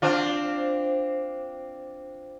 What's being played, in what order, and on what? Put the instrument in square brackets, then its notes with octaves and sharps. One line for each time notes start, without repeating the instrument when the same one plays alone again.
[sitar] C4 D4 F4